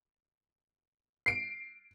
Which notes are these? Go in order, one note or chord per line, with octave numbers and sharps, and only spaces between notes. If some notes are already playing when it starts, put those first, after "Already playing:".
C7 D7